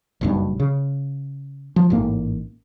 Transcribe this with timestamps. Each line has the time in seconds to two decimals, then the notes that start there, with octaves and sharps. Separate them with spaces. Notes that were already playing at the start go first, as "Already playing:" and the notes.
0.21 F#1 B1 G2
0.60 C#3
1.76 F3
1.90 A1 G#2 A#3